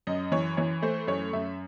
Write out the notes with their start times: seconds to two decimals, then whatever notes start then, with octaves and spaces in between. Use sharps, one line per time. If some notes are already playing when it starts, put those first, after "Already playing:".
0.07 F#2 D#5
0.32 E3 C#5
0.57 E3 C#5
0.82 A3 C5
1.07 F#2 C#5
1.33 F#2 E5